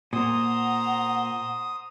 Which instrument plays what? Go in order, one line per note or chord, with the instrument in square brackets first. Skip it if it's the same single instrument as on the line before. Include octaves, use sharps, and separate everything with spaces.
[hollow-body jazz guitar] A#2 [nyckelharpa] C5 A#5 [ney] F#5 [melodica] D#6